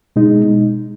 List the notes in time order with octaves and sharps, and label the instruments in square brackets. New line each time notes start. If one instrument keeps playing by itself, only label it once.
[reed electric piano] B2 G#3 D#4